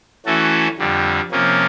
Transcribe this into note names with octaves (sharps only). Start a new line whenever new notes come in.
E3 A3 C#4 F#4 A4
F2 D3 G3
C3 F3 A#3 C#4 F4